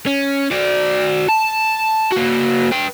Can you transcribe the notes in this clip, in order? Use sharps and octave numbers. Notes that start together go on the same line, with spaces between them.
C#4
F#4 D5
A5
A#3 F#4
B4 G5